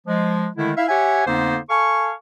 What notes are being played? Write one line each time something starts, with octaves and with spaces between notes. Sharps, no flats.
F3 G#3
D3 D#3 G#3 A3 E4
E4 E5 F5
G4 C#5 E5 F#5 G#5
F2 D3 A#3 B3 D#4 C5
A4 F5 G#5 C#6